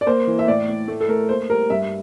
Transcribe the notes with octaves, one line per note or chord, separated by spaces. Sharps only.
D5
A#3 C5
E3
E5
A2 D5
A2
A3
A4
A3 A#4
A#3 C5
G3 A#4
G2 E5